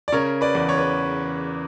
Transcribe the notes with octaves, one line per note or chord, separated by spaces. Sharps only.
D5
C#3 A#4 C#5
B4 D5
E2
C#5
B4